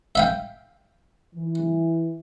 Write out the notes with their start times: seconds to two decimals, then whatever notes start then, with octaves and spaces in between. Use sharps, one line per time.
0.15 E5 F5 G5
1.35 E3